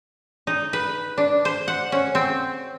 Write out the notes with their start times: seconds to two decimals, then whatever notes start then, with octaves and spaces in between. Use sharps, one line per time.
0.47 D#4
0.73 B4
1.18 D4
1.45 C5
1.68 F#5
1.92 C#4
2.15 C4